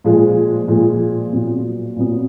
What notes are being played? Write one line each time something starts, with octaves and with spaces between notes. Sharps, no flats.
A#2 F3 G#3
A#2 F3 G#3
A#2 F#3 B3
A#2 F#3 B3